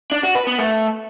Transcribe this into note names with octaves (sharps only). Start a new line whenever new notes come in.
D4
F#4
B4
B3
A3